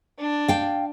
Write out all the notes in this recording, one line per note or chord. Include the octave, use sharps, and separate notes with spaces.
D4
F5 G5